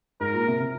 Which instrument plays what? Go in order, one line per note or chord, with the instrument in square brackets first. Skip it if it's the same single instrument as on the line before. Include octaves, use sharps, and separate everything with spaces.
[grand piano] G#2 [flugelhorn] A#4
[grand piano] A#2
C3
C3